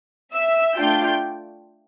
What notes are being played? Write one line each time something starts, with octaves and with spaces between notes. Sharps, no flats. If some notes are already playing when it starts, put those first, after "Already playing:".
E5 E6
A3 D4 F4 G5 G6